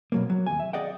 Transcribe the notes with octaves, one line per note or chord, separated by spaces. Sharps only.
B2 F#3 A#3
F#3
D#2 G#5
E5
G#4 D5 D#5 F#5 G5